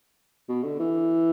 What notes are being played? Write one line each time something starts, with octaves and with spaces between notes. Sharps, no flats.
B2
D3
E3